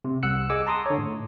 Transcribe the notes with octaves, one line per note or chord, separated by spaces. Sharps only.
C3
C2 F#5 E6 F#6 C#7
G#4 D#5 G#5 D6 E6
A5 A#5 C6 D6 D#6
D3 C#5
A2